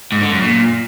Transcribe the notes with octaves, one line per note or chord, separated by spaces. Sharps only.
G#2
D3
F#2
A#2